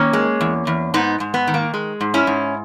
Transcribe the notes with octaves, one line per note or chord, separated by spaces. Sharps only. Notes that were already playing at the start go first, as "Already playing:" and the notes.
Already playing: D#3 A#3 C#4
G#3
E2
E2
G#2 B3 D#4
G#2
B3
D#3
A#3
G#3
G#2
C#4 E4
G#2